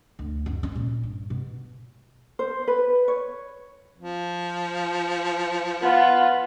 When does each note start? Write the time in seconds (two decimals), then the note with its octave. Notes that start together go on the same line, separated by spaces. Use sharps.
0.19 D2
0.46 F#2
0.63 C#4
0.75 A#2
1.03 G2
1.30 B2
2.39 C5
2.67 B4
3.08 C#5
3.98 F3
5.82 B3 F4